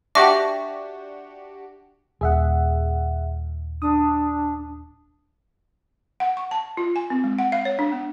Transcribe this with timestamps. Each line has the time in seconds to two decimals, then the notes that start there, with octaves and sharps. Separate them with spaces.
0.15 D4 F#4 G4 E5 D6 A#6
2.21 D#1 G#4 E5 F#5
3.82 D4 D#6
6.20 F#5
6.37 C#6
6.51 A5
6.77 F4
6.96 G#5
7.10 C4
7.24 G#3
7.39 F#5
7.52 F5
7.65 C#5
7.79 D4
7.92 B3